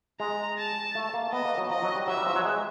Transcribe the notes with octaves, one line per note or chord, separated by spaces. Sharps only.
G#3 A#5
A5
A3
A#3
B3 D#5
A#3
F#3
F3 D#5
F#3
G3
F#3 E5
G3
F3
F#3
G#3